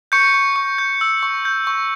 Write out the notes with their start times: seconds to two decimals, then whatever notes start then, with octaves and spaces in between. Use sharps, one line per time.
0.12 C#6 G6 C#7
0.34 C#6
0.56 C#6
0.78 G6
1.01 E6
1.23 C#6
1.45 G6
1.67 C#6